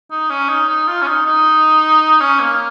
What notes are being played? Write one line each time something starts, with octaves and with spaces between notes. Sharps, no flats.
D#4
C#4
D#4
D#4
F4
C#4
D#4
D#4
C#4
A#3